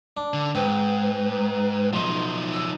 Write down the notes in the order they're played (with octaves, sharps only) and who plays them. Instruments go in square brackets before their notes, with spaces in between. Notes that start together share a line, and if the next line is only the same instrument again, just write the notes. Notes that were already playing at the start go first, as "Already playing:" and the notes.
[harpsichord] D4
[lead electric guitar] D3
[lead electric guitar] G#2 [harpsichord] C4 [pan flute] B4
[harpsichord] B1 [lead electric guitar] F3 D#4 [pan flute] C6
[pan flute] E6